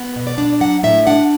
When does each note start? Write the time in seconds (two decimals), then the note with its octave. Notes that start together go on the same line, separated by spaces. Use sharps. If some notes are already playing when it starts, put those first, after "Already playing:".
Already playing: B3
0.16 B2
0.27 D5
0.38 D4
0.60 F#3 F#5
0.83 A2 E5
1.07 D4 F#5